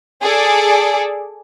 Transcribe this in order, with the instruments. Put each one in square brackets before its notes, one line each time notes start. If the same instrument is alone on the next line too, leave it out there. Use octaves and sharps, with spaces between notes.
[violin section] G#4 A4 D5